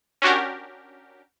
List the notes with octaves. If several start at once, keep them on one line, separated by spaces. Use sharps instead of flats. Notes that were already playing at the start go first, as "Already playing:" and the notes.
C#4 D4 F#4 G4 A#4